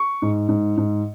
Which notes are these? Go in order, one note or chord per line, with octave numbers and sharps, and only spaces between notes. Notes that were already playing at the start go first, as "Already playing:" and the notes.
Already playing: C#6
G#2
G#2
G#2